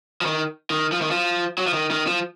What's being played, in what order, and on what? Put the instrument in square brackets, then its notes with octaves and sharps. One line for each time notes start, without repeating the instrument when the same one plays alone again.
[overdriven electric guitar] F3
D#3
D#3
F3
D#3
F3
F#3
F3
D#3
D#3
F3